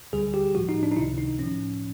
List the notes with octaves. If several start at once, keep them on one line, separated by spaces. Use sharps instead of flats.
D2 D3 G3 G#4
G4
A2 F3 F#4
D#4
D4
D#4
C#2 C3 D#3 E4
D#4
A2 F3 C#4